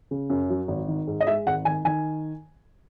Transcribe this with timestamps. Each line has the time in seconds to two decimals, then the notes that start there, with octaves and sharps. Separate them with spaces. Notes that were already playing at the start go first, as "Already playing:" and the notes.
0.11 C#3
0.30 F#2
0.50 F#3
0.68 G#1
0.88 D#3
1.07 G#2
1.20 D#5
1.27 G#3 E5
1.46 G#1 F#5
1.65 D#3 G#5
1.85 D#3 G#5